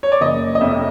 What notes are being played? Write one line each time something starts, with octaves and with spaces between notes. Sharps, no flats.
C#5
D5
F#1 D#5
D#5
F2 C3 E5